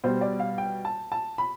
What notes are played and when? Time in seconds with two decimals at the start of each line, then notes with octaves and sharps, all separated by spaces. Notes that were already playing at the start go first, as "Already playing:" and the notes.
0.04 B2 G3 C5
0.21 D5
0.40 F5
0.58 G5
0.85 A5
1.12 A5
1.38 B5